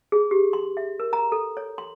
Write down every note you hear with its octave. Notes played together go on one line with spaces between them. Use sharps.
G#4
G4
C6
E5
A#4
A#5
A4
C#5
C6